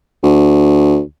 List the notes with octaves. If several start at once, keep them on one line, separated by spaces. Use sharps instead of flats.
D2